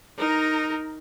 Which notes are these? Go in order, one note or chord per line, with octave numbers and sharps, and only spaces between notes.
D#4 A#4